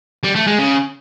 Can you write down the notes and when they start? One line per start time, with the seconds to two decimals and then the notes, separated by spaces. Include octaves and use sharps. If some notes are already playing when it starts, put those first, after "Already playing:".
0.24 G3
0.36 A3
0.47 G#3
0.59 C#3